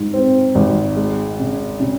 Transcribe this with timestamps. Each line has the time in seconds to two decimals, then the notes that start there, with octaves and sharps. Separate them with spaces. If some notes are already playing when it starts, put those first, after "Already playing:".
Already playing: G#2
0.14 C4
0.55 G#1
0.96 G#3
1.39 C#3
1.80 C#3